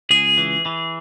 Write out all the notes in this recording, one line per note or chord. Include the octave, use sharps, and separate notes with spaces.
C#2 G#4
E3
E3